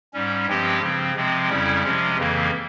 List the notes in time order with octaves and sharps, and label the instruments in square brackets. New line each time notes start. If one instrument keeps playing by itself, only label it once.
[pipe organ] G#2 G3 C#4
G2 F3 G#3 C4 G4
C#3 F3 C4
C3 F3 G#3 C4
F2 C#3 G3 C#4 E4
C3 F3 G#3 C#4
F2 C#3 E3 A#3